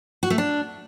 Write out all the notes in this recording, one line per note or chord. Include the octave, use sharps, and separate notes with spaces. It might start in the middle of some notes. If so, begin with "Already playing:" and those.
F#4
A3
D4